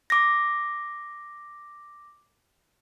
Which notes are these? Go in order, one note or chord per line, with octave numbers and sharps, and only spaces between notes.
D6 A#6